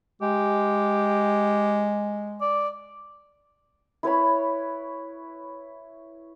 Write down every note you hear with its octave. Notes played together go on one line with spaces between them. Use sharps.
G#3 G4
D5
E4 B4 C#5 B5